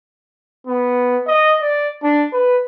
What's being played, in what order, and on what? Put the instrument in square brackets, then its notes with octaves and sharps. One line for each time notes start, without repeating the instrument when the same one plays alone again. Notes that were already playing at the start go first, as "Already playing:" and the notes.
[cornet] B3
D#5
D5
D4
B4